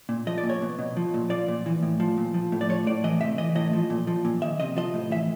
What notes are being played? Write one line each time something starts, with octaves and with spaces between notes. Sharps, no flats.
A#2
F3 D#5
D5
A#2
C#5
B2
B2
F3
A#2
F3 D5
A#2
E3
A2
F3
A#2
F3
A2
D5
F3 C#5
A2 D5
E3 D#5
C3 E5
E3 D#5
A2 D#5
F3
A#2
F3
A#2
D#3 E5
C3 D#5
F3 D#5
A2
E3 E5